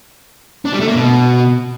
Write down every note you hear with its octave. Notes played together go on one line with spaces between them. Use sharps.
D4
G3
A3
A#3
B2